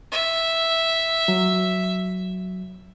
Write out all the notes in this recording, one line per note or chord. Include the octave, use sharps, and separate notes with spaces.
E5
F#3